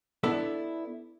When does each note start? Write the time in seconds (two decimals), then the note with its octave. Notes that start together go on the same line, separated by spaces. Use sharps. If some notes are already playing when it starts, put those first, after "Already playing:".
0.24 B3 D4 E4 A4 B4